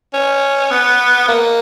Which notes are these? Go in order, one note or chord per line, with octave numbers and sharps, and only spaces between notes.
C#4
B3
A#3